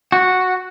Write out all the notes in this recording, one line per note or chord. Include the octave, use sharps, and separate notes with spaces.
F#4